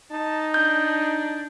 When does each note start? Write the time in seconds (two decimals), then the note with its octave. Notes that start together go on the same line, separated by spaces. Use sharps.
0.12 D#4 A5
0.54 D4 G6